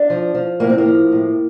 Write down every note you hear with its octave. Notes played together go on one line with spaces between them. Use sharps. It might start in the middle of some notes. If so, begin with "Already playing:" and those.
Already playing: D4
F3
F3
A2 A#3
C4
A#3
F3
A2